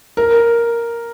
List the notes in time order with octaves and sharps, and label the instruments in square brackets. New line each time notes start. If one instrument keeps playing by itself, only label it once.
[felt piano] A#4